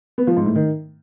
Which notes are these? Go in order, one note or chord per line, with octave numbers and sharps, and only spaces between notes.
B3
F3
G#2
A2
D#3